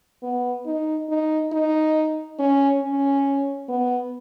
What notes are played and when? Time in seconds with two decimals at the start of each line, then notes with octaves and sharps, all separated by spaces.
0.23 B3
0.66 D#4
1.09 D#4
1.52 D#4
2.39 C#4
2.82 C#4
3.69 B3